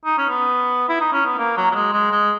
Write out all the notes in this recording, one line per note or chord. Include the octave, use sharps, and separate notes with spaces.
D#4
C#4
B3
E4
D#4
C#4
B3
A#3
F#3
F#3
G#3
G#3
G#3